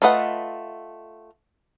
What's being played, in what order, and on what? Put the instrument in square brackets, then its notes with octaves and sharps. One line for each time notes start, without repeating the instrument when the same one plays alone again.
[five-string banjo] A3 F4 B4 D#5 F#5